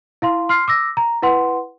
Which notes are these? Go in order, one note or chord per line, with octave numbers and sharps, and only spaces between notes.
E4 F5 C6
C6 F6 C7
D6 E6 A#6
A#5
E4 B4 F#5 C6